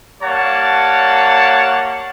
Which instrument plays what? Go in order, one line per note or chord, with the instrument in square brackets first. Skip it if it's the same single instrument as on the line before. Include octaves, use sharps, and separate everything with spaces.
[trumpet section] G3 A#3 C#5 F#5 A5